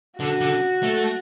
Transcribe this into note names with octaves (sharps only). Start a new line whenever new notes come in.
D3 F#4
D3
A3